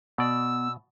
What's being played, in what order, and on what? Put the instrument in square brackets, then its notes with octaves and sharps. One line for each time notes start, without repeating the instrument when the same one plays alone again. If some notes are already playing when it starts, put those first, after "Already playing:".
[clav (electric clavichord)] B2 D5 [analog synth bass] B3 [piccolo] E6